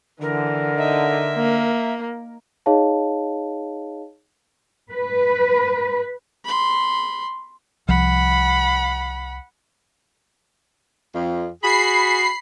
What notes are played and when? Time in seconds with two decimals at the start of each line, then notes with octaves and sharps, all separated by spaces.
0.21 D3 E3 A#4
0.78 D#4 E5
1.36 A#3
2.66 D#4 G#4 C#5 D#5 F5 A5
4.92 B4
6.45 B5 C6
7.89 C2 F3 F#5 B5
11.14 F2
11.63 F#4 G#4 B5 C7